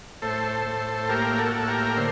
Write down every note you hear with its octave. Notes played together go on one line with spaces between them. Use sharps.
A2 A4 C5
A2
A#3 G4 A#4
F#4 A4
A2
G4 A#4
D3 C5